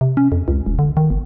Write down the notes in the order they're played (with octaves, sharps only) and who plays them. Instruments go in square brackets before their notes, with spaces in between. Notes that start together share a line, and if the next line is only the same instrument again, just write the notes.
[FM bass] C3
C#4
F2
C#2
E1
D3
D#3
G1